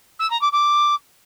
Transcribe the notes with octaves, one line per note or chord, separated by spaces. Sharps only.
E6
A#5
D6
D6